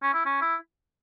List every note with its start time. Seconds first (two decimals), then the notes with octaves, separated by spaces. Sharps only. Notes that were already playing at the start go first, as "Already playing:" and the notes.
0.02 C#4
0.14 E4
0.26 C#4
0.41 E4